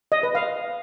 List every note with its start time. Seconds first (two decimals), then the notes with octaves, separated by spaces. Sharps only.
0.12 D#5
0.23 B4
0.35 F5